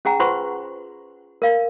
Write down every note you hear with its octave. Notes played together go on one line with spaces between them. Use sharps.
C#4 G#4 F#5 A#5
F4 B4 C5 F#5 C6 C#6
A#4 F5